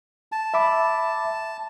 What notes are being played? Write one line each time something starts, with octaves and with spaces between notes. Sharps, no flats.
A5
E5 B5 D6